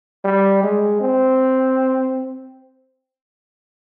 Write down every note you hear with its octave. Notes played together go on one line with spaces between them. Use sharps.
G3
G#3
C4